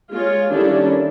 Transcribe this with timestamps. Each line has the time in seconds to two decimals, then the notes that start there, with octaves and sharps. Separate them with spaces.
0.11 G#3 F4 C#5
0.52 D#3 G3 C#4 D4 E4 A4